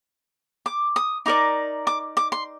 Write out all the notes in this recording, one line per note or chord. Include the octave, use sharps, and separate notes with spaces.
D6
D#6
D#4 A#4 D5 D6
D6
D6
C6